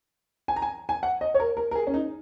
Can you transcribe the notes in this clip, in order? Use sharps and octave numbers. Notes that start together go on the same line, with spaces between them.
G#5
A#5
G#5
G#5
F#5
D#5
C#5
A#4
A#4
A#4
G#4
C#4
D#4